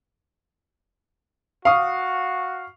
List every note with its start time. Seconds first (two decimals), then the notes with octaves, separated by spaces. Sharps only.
1.65 F#4 F5 C#6 D#6